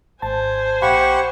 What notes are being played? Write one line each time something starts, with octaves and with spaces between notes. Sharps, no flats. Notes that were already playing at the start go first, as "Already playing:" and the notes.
G#1 C5 G#5 A5
A#1 G4 F5 F#5 B5 C#6